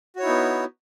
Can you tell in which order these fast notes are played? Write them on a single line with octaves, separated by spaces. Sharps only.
F#4 C#5 E4 D#4 B3